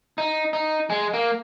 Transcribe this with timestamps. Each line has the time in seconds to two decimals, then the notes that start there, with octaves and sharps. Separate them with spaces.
0.18 D#4
0.53 D#4
0.90 G#3
1.13 A#3